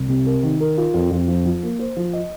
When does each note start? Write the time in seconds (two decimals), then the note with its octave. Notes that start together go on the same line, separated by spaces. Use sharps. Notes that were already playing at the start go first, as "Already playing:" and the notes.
Already playing: C2
0.09 C3
0.26 A#4
0.43 D#3
0.60 A#4
0.78 F4
0.94 F2
1.11 F2
1.28 F3
1.45 F3
1.63 A#3
1.79 C5
1.97 F3
2.13 D#5